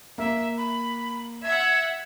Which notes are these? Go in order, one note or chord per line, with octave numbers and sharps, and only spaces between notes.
A#3 E5
B5
E5 F#5 G#6